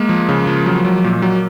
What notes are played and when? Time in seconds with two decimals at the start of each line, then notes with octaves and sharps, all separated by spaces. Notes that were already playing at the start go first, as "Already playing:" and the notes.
Already playing: G#3 A#3
0.09 F3
0.29 C#3
0.47 F3
0.66 F#3
0.85 F#3
1.04 A#2
1.22 F#3